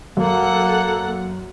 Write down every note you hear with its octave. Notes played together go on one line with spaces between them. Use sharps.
F#2 A#3 A4 F#5